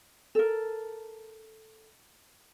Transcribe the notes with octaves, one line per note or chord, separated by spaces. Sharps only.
A4 A#4